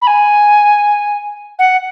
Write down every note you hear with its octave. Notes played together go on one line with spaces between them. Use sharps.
B5
G#5
F#5